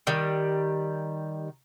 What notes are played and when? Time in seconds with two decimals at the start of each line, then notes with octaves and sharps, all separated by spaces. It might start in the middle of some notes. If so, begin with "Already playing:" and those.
0.07 D#3 G3